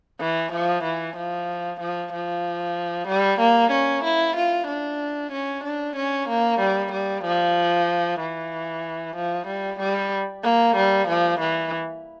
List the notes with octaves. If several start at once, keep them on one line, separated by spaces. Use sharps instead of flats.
E3
F3
E3
F3
F3
F3
G3
A#3
C#4
E4
F4
D4
C#4
D4
C#4
A#3
G3
G3
F3
E3
F3
G3
G3
A#3
G3
F3
E3